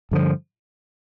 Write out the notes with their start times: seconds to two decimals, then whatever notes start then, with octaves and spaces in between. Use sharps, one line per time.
0.11 G2 D3 F3